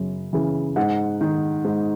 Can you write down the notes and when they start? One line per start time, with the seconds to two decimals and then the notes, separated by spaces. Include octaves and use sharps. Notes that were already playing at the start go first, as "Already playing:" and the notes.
Already playing: F#2 C#3
0.33 C#3 E3
0.76 G#2 F#5
1.21 D#3
1.65 G#2